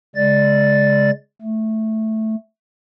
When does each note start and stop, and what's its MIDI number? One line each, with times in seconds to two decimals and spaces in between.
0.16 1.11 49
0.16 1.11 56
0.16 1.11 74
0.16 1.11 93
1.41 2.35 57